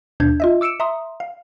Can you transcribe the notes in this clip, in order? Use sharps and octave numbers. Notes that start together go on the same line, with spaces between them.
D#2 B2 D4 G6 G#6
F4 D#5 E5
D6 E6 C#7 D7 E7
E5 A#5 C6 D#6
F5